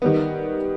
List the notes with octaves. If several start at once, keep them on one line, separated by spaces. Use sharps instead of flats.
D#3 G3 B3